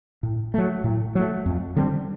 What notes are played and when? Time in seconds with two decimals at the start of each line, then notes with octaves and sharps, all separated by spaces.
0.23 A2
0.54 F#3 A3
0.84 A2
1.15 F#3 A3
1.46 F2
1.76 D3 G3 C4